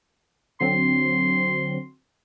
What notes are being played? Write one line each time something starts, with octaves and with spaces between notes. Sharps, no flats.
D3 F#3 C4 C6